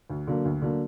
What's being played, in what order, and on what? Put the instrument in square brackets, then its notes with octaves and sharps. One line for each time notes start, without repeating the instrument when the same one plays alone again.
[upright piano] D2
D3 F#3 A#3
D2
D3 F#3 A#3